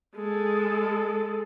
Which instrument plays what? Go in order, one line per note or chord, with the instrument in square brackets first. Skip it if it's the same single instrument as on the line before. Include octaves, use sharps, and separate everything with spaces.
[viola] G#3 A4